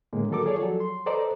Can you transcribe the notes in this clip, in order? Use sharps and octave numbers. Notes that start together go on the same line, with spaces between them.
A2 D3 G#3 A#3
D#3 F#3 A4 A#4 D6
F4 G#4 A4 C#5 D5
F3 F#3 A4
C6
A4 B4 C5 D5 D#5 A#5